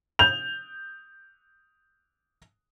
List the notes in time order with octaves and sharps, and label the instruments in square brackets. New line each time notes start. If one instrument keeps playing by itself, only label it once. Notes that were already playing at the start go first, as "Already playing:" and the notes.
[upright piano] G6 F7